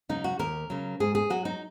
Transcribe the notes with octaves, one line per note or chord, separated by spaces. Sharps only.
C#3 F#3 D#4
F#4
D#2 A#4
C#3 F#3
G#2 G#4
G#4
F#3 F#4
D#4